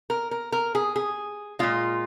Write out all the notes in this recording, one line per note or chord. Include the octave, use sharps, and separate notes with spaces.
A#4
A#4
A#4
G#4
G#4
A#2 G#3 F4